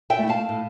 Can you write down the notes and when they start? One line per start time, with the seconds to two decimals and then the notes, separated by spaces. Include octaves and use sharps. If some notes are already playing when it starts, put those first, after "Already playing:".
0.10 E5 G5
0.19 A3 E4
0.29 F5 A5
0.49 A2